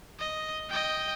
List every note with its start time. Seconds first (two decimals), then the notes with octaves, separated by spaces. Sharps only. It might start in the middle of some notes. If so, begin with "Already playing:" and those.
0.19 D#5
0.69 D#5 G5